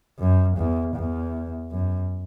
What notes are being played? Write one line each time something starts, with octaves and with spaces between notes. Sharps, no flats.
F#2
E2
E2
F#2